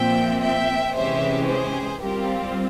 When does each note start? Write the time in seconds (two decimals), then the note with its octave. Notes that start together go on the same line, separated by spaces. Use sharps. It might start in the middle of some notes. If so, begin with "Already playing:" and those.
Already playing: A#2 F3 C4 E5 G5
0.42 E5 G5
0.95 C3 E3 G#3 C#4 G4 C5 E5
1.48 G#4 C5
2.01 G3 C4 F4 G4 A#4